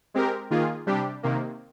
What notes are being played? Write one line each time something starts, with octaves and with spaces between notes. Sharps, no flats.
G#3 C4 G4 A#4
D#3 A#3 F4 G#4
C3 G3 D4 G4
C3 D#3 A#3